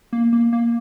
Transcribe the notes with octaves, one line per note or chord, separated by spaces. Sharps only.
A#3
A#3
A#3